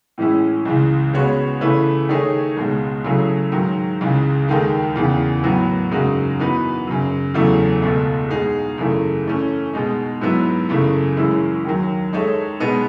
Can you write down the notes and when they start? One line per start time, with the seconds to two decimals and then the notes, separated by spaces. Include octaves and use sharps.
0.18 A2 E3 G#3 C#4 E4
0.65 C#2 C#3 E3
1.13 C#3 G#3 B3 F#4 C#5
1.61 C#3 E3 A3 E4 B4
2.09 D#3 A3 D#4 G#4 C#5
2.57 C#2 B2 G#3
3.05 C#3 F#3 A3 E4 G#4
3.52 G#2 D#3 F#3
4.00 C#2 C#3 E3
4.48 D#2 D#3 G#3 D#4 A4
4.96 E2 C#3 E3
5.43 A2 F#3 B3 F#4
5.91 F#2 C#3 G#3 D#4 F#4
6.39 E3 B3 D#4 F#4 B4
6.87 F#2 C#3 F#3
7.34 E2 C#3 F#3 A3 E4
7.82 C#2 B2 A3
8.30 B2 G#3 D#4 G#4
8.78 F#2 C#3 E3 A3
9.26 E3 A3 C#4
9.73 B2 G#3 D#4
10.21 G#2 F#3 B3 E4
10.69 F#2 C#3 E3 A3
11.17 F#2 E3 G#3 C#4 E4
11.64 D#2 D#3 F#3
12.13 G#3 D#4 A4 C#5 E5
12.60 B2 G#3 B3 D#4